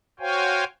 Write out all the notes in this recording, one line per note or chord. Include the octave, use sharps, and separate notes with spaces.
F#4 C5 C#5 F5 G5 G#5